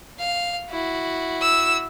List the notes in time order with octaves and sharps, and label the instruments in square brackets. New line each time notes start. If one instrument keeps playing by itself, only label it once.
[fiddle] F5
E4 F#4
[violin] E6